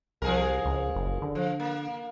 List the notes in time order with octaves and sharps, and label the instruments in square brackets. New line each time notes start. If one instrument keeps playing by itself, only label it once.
[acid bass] C2 [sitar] F3 G#4 A#4
[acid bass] C#2
F#1
D3
[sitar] F3
A#3